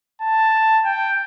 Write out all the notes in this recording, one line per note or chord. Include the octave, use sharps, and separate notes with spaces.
A5
G5